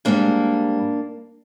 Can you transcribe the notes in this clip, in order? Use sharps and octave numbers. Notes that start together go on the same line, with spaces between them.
G#2 G3 A#3 D4